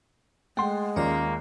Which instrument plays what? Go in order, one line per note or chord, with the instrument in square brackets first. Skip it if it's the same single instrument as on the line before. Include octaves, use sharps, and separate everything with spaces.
[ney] G#3 [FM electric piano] A3 F#5 [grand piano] G5 C6
[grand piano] D#2 F4 [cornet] A#3 [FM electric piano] C#4 A#4 D5